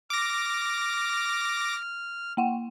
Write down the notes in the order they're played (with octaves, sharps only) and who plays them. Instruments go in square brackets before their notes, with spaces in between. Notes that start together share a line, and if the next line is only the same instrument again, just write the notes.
[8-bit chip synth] D6 A#6 [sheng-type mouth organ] F6
[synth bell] A#3 F#5 G5